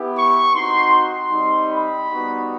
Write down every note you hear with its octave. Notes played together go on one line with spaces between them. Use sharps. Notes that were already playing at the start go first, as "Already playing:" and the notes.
Already playing: B3 E4 G4
C#6
C4 D#4 F#4 C6
C6
G3 C4 D#4
B5
G3 B3 D#4 F#4